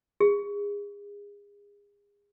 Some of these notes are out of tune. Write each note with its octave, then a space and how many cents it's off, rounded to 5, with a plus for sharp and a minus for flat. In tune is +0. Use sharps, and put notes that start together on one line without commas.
G#4 -30